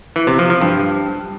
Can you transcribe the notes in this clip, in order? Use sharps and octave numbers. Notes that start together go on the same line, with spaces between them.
E3
C3
F3
F3
G2